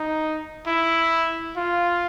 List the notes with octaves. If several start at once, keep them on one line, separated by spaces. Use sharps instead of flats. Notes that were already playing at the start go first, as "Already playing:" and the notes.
Already playing: D#4
E4
F4